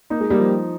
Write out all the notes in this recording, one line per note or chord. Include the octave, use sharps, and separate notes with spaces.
A#3 D#4
G#3
G3 A#3
F3